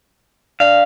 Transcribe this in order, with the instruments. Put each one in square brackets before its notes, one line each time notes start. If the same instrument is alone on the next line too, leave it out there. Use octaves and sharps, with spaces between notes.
[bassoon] D4 [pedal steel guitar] F5